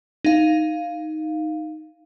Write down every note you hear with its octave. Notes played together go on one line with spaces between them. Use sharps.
D#4 F5